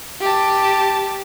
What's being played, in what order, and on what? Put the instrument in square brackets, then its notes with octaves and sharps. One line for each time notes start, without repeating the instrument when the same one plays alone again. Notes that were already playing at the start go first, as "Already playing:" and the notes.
[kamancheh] G4 A5